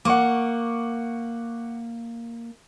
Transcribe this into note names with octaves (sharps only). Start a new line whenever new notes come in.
A#3 F#5 C#6 D6